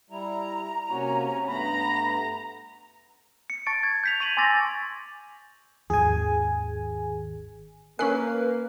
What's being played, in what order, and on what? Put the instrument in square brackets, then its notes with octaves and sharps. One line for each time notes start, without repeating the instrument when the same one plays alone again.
[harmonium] G3 E4 [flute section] A#5
[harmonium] C3 A#3 F#4 [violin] C#4
[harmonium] G2 A3 B3 [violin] A#5 [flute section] B5
[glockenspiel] C#7
A5 C#6 A6 C#7 D7
G#6
G6 B6 F7
C#6 G#6 D#7 F7 F#7
G#5 C6 D6 E6 A6 A#6
[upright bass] G#1 D#2 [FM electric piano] G#4 G#5
[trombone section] A#3 [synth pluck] C#4 B5 C7 [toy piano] A#4 G#5 [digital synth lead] B4